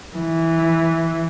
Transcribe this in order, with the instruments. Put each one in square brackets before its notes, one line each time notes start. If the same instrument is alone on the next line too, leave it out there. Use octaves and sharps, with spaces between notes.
[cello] E3